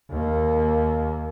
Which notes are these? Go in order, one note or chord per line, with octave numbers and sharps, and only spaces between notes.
D#2 A#3